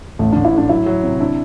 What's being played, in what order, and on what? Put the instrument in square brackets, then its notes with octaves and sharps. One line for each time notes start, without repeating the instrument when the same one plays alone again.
[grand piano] A1 [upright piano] A3
[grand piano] A1 [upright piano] D4
[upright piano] E4
[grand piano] A2 [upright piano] D4
[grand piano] F#3 [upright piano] E4
[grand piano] F#3
C3
[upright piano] D4 [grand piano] E4